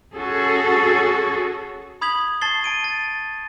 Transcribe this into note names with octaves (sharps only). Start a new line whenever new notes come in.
C#4 F#4 G#4 A4
B5 D#6 G#6 B6 F7 F#7
A5 C#6 G#6 A6 C7 G7
A5 D7 D#7
A6